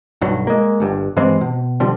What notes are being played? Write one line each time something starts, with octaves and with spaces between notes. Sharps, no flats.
B1 G2 F#3
G#3 A#3
G1 G2
G2 E3 G#3 C4
B2
B2 D3 F3 G3